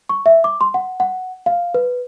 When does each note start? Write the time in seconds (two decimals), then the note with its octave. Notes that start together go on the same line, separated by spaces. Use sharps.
0.09 C#6
0.26 E5
0.44 D6
0.61 C6
0.74 F#5
1.00 F#5
1.46 F5
1.74 B4